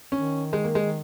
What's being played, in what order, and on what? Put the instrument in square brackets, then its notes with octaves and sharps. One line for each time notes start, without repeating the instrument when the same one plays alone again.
[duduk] D#3 [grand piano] C#4
[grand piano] G#3
A#3
G#3